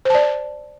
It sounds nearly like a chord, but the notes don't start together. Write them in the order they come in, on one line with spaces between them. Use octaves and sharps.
C5 A5 D5